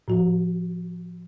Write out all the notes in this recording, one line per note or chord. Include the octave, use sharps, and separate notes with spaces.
A2 F3 F#4